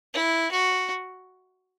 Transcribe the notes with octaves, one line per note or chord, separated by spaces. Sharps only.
E4
F#4